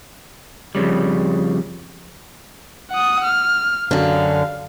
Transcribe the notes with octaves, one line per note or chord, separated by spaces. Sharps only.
F2 A2 C#3 G3
F#5 D#6
F6
F#2 D3 F5